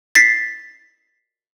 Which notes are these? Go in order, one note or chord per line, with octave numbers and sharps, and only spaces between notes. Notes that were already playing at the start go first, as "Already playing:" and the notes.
A6 B6 C7